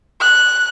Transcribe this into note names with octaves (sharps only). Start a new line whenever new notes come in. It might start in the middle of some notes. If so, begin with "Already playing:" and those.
F#6